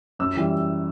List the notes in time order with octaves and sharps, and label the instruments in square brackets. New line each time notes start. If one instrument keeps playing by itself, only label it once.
[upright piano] F#2 E6
E3 G3